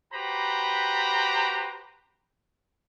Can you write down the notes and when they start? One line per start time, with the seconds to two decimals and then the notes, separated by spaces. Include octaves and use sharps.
0.14 F#4 G4 B4 C5 A#5 B5